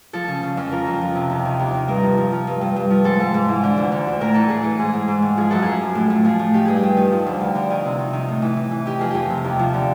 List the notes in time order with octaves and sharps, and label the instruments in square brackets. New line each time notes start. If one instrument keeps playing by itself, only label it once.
[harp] F3 A4
C#3
C#3
F2
F3 A#4
F2
F3
C3
D#2
D#3
D#2
D#3
G2 A#4
F3
F3
F3
G2
G2
G2
F3
G#2 A4
G#2
G#2
E3
D3
D2
D3
D2
A2 A#4
E3 A4
A2 G#4
E3 A4
G#2 G#4
G#2
G#2
D#3
F3 G#4
F#2 A4
F#2 G#4
F3
A2
A2
F3 G#4
A2
D#3 G4
G2 G#4
G4
G2
D#3
F3
D2
D2
D3
D#3
C3
D#3
D#3
A2
E3
E3
E3
D#3 G4
F2 G#4
F2 G4
C3
D#2
F3
D3